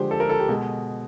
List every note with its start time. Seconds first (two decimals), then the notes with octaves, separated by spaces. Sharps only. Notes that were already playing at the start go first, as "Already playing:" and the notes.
Already playing: D3 F3 G#3 G4 C5
0.11 A4
0.20 A#4
0.29 A4
0.39 G4
0.49 B2 G#3